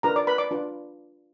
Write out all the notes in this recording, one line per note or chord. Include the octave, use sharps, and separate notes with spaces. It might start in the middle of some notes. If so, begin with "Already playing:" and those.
D4 F4 A#4 B4 A#5
D5 D6
B4 B5
D5 D6
D4 F4 B4